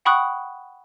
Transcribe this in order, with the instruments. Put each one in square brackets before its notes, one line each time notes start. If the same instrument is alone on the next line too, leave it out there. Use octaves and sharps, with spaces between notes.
[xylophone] F#5 G5 B5 C#6 D#6 F#6